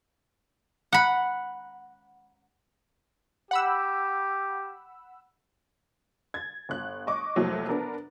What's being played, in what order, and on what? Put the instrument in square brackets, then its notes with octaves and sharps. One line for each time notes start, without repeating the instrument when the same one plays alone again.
[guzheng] F#5 B5
[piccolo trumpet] G4 [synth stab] F#5 B5 E6
[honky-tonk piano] G#6 A6
G1 F#6
D#5 C#6 D6
C2 F2 A2 C3 F#3 A#3
B3 D4 A#4